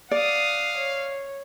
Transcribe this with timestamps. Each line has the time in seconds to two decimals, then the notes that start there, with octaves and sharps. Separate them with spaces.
0.11 D5 F5 F#5 D#6
0.77 C#5